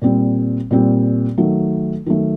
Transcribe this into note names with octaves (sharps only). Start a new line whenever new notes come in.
A#2 G3 C4
A#2 G3 C4
D#3 F#3 A3
D#3 F#3 A3